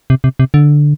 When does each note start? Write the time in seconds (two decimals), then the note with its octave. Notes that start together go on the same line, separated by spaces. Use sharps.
0.10 C3
0.24 C3
0.39 C3
0.54 D3